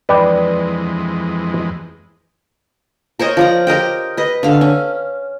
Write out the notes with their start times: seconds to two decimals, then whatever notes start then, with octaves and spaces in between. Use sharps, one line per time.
0.09 F2 E3 G#3 B4 D5 G5
3.19 A#4 C5 C#5 D#5
3.37 F3 D5 A#5
3.67 G4 A#4 D#5 G5
4.17 B4 D#5
4.43 D3 F5
4.61 C#4